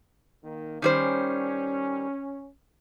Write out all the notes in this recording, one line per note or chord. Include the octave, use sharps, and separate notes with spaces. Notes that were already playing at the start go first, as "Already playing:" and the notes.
D#3 A#3
D#3 G3 C#4 C5